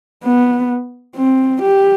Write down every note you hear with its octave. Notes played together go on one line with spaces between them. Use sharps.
B3
C4
G4